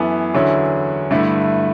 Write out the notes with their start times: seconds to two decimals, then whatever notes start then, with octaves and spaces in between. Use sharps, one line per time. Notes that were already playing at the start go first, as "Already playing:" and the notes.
Already playing: F#2 E3 B3 E4 A4
0.34 E2 D3 F#3 C#4 E4
1.11 G2 D3 A3 E4